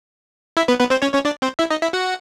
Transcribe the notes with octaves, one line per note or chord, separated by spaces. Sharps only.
E4 E5
B3 B4
B3 B4
C4 C5
C#4 C#5
C#4 C#5
D4 D5
C4 C5
E4 E5
D#4 D#5
E4 E5
F#4 F#5